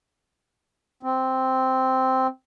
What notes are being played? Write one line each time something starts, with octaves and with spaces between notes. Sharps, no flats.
C4